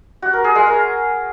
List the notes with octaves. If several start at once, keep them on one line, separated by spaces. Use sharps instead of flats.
F#4
A#4
G#4
G#3
A#4